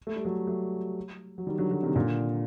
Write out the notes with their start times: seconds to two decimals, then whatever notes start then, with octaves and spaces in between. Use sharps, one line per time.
0.07 A3
0.16 G3
0.25 F#3 A3
0.47 F#3 A3
1.38 F#3
1.47 D#3 G3
1.58 D3 F#3
1.71 D3 F#3
1.83 C3 D#3
1.95 A#2 D3